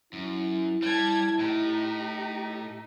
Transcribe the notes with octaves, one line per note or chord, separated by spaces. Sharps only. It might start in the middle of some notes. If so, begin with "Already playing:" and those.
F#2 E4
G3 A5 G#6
A2 D#4 G4